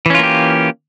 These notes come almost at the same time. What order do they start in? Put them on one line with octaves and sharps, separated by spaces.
E3 C#4 F4 A#3 G4